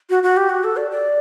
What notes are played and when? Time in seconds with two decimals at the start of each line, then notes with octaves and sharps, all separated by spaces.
0.10 F#4
0.23 F#4
0.37 G4
0.50 F#4
0.64 A4
0.77 D5
0.91 D5